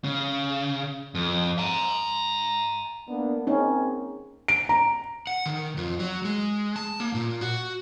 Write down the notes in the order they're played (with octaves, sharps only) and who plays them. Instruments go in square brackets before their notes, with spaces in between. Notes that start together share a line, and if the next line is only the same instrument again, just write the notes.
[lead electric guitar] C#3
F2
G#5 A#5
[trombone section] A#3 B3 D4
[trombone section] A#3 C4 G#4 [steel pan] C#4 D#4
[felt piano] D7
A#5
[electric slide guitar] F#5
D#3
F2
F#3
G#3
A5
A#3
A#2
F#4